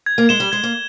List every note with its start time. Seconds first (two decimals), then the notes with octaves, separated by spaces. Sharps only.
0.06 G#6
0.18 A#3
0.29 G#3 E7 G7
0.40 G3
0.52 G#3 G#6
0.63 A#3